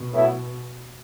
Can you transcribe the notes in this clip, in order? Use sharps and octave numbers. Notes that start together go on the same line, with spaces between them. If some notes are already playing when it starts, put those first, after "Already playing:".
Already playing: B2
A2 F#3 B3 E4